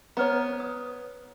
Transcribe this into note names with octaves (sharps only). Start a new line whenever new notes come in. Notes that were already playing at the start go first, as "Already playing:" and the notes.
B3 B4 C#5 A#5
D#6